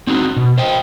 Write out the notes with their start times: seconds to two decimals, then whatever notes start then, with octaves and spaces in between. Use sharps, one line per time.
0.07 C4 D#4 F#4
0.36 B2
0.58 C5 D#5 G5